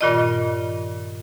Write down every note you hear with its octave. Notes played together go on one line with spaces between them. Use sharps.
G2 A#2 D#3 F4 D5 D#5